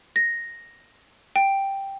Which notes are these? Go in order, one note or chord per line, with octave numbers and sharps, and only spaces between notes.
A#6
G5